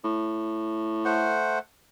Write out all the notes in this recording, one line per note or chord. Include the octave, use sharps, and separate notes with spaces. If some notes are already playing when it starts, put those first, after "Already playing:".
A2
A3 C5 F#5